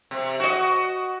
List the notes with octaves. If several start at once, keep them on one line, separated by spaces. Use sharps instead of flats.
C3
F#4 D#5